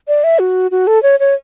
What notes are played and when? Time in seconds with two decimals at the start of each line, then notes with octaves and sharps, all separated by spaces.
0.08 D5
0.24 E5
0.39 F#4
0.71 F#4
0.87 A4
1.03 C#5
1.20 C#5